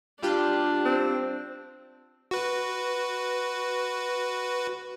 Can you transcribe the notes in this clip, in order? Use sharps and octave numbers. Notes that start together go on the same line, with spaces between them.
G3 D4 F4 G4
C4
F#4 B4